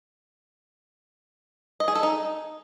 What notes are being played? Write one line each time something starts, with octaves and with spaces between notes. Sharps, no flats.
D#5
G#4
A4
D#4